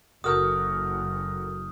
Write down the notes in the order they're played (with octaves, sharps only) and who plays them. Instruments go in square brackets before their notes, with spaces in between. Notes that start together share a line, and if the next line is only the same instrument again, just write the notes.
[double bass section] F#1 [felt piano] F#4 A4 A#4 [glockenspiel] D#6 F6 G6